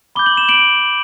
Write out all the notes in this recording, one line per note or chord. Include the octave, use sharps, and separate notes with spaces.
B5 D6 G6 G7
F#7
E7
D7 F#7